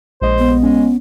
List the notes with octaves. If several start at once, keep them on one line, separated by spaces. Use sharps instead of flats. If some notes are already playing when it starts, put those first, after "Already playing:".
A#1 G#3 C5 D#5
B3
G#3 C#4